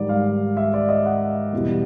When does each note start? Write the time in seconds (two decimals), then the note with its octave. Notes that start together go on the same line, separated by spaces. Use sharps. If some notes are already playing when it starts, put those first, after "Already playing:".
Already playing: G#2 D#3 G3 D5
0.09 F5
0.57 E5
0.74 D5
0.89 D#5
1.06 F#5
1.53 E2 B2 G3